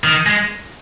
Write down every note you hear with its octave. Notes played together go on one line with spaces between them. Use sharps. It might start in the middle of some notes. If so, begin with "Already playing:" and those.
D#3
G#3